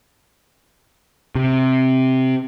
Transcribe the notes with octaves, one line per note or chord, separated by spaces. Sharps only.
C3